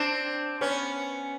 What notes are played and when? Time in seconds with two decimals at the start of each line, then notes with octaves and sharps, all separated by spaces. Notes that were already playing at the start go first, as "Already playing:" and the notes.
Already playing: C4 D4
0.61 B3 C#4